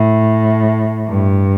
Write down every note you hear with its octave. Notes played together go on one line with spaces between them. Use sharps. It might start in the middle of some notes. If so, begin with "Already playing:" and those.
Already playing: A2
G2